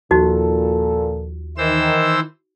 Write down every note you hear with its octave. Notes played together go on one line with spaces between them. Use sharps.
D#2 A#2 F3 D#4 F#4 A4
D#3 E3 C5 E6